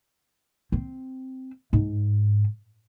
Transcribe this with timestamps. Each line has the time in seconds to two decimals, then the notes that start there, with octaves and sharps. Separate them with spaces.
0.72 C4
1.73 G#2